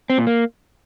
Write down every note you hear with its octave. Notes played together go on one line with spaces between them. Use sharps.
C4
A#2
A#3